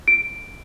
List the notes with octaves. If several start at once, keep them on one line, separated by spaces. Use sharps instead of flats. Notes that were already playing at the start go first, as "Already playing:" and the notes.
D7